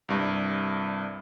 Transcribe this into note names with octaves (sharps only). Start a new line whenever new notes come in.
C2 G2